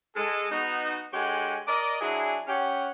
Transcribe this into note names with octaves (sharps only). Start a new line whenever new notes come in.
G#3 A4
B3 D#4 F#4
D3 G#3 G4 C#5 F#5 G#5
A#4 D5 D#5
F#3 D4 E4 G#4
C#4 G4 F#5